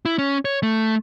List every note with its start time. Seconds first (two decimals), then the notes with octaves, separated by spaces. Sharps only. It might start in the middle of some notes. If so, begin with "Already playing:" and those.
0.05 E4
0.18 C#4
0.45 C#5
0.63 A3